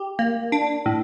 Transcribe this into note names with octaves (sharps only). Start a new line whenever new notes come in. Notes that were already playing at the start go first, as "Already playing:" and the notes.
Already playing: G4
A#3
D4
A2